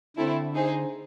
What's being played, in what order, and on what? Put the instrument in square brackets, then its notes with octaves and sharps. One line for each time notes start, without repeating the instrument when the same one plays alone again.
[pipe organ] D3 [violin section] A3 C4 E4
[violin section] D#4 G#4 C5